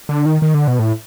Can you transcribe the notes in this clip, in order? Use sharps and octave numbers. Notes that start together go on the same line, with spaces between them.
D3
D#3
D#3
D3
B2
A2